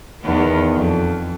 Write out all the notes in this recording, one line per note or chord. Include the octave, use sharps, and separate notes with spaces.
E2 D#3 B3
F2